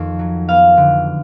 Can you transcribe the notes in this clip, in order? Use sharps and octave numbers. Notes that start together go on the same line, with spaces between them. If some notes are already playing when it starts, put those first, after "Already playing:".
Already playing: F2 D#3 A#3
F#3
B3 F5
D3